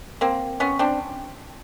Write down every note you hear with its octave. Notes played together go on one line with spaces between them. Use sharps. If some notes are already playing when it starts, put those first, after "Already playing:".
A#3 C4
B3 C#4
C4 D4